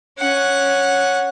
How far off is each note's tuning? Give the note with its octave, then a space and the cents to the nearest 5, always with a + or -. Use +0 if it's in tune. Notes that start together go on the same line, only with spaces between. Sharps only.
C#4 +0 F#5 -10